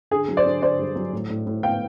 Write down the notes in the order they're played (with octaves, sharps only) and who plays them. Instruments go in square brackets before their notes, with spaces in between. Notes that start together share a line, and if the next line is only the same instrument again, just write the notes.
[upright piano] D3 G#4
F#3
C5 D5
D3
D3 C5 D5
G2
F#3
A2
A2
A2
B3 F5 G5